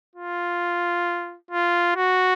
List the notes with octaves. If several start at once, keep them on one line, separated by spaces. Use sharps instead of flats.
F4
F4
F#4